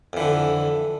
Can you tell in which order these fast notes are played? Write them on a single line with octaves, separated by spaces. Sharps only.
F2 E3 D3